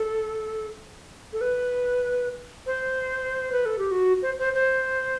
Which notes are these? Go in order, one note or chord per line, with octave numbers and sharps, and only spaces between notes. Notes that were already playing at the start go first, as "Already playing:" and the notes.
Already playing: A4
A4
B4
C5
B4
A4
G4
F#4
C5
C5
C5